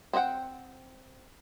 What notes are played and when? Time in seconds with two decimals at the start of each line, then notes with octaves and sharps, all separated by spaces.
0.13 C4 C5 D#5 F#5 G5